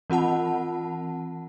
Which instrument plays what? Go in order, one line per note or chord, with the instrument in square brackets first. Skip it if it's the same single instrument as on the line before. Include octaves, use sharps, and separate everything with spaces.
[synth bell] E3 C4 F4 F#5 A5